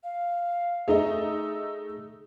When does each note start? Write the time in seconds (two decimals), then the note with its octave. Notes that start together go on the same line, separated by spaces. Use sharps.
0.04 F5
0.88 A3 D#4 G#4 D#5 E6